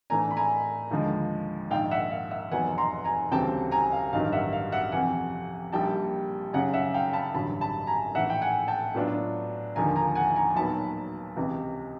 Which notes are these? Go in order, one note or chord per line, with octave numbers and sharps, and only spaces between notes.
A2 E3 A3 D4 G#5 A#5
B5
G#5 A#5
D#2 D3 F3 G#3
A#1 G#2 D#3 F5 G5
E5 F#5
F5
E5 F#5
F1 E2 B2 F#3 B3 F#5 G#5
A#5 C6
G#5 A#5
D2 C#3 E3 G3 C4 G5 A5
G#5 A#5
F5
A1 G2 D#3 F#3 F5
E5 F#5
F5
E5 F#5
F2 C3 E3 F#5 G#5
A#1 A#2 G3 G5 A5
F#2 C#3 F#3 F#5 G#5
E5 F#5
F5 G5
A5 B5
A1 G2 D3 F#3 A5 B5
A5 B5
G#5 A#5
A#1 A2 E3 E5 F#5
G5
F#5 G#5
G5 A5
A2 F#3 B3 D4 F4
E1 D#2 D3 F3 A#3 G#5 A#5
G#5 A#5
F#5 G#5
G#5 A#5
B1 A#2 F#3 B3 A5 B5
C#2 C3 E3